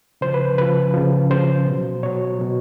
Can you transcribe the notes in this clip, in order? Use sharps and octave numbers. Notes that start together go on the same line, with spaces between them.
C#3 F3 C5
B4
C#3 F3 B4
C#3 F3
C#3 F3 C5
B2 F#3
B2 F#3 C#5
B2 F#3